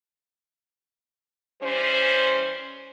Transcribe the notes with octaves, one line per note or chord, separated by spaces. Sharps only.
E3 G3 C#4 C5